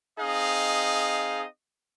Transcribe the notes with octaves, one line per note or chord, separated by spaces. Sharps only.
C4 D#4 G#4 D#5 F5